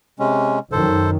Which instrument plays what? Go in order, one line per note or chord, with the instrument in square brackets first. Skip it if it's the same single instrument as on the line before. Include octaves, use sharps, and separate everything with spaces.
[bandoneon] C3 G#3 C#4
[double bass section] F#2 D#3 [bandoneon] A4 C5